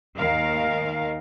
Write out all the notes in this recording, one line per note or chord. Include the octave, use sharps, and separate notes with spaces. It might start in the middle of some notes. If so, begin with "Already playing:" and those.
D#2 D#3 A#4 F5